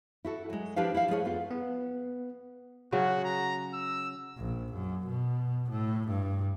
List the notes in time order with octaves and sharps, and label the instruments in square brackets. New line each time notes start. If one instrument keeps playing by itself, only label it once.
[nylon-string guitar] E4 F#4 A4
F#3 G#3
F3 D4 E4 G4 B4 F5
E4 E5 F5
F3 G#3 G#4 C#5
F2 B3 F4
[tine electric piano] B3
[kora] C#3 F#3 [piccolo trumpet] F#4
[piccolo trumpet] A#5
E6
[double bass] A#1
F#2
B2
A2
G2